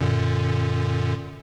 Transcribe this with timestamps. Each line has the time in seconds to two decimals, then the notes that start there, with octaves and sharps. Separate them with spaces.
0.01 F#2 A#2 D3